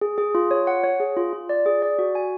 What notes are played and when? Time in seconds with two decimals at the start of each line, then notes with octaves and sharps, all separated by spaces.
0.01 G#4
0.18 G#4
0.35 F4
0.51 C#5
0.67 F#5
0.84 C#5
1.00 G#4
1.17 F4
1.33 F4
1.49 D5
1.66 G#4
1.82 D5
1.99 F#4
2.15 G#5